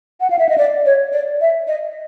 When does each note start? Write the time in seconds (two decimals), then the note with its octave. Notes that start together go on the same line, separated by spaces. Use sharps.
0.20 F#5
0.30 F5
0.39 E5
0.49 D#5
0.58 D5
0.85 C#5
1.12 D5
1.41 E5
1.67 D#5